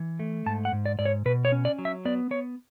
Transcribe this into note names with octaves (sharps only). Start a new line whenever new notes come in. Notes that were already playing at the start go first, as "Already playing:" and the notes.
Already playing: E3
A3
G#2 A5
F#5
G#2
D5
G#2 D5
C#5
B2 B4
C#5
C#4
D5
F#3
E5
B3 D5
B3 C#5